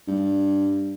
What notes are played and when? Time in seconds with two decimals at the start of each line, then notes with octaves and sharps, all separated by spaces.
0.08 G2